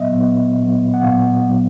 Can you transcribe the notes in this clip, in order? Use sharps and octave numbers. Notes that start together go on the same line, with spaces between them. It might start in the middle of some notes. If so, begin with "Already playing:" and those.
Already playing: A#2 F#3 B3 D#5 E5
A#2 F#3 B3
A#2 F#3 B3
F#5
A#2 F#3 B3 F5
A#2 F#3 B3